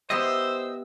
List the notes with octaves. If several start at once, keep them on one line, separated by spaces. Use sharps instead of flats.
B3 E4 G4 C5 D#5 E6